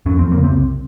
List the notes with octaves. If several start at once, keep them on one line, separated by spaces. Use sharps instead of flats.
F2 C#4
F2 C4
C#3 A#3
C4
C2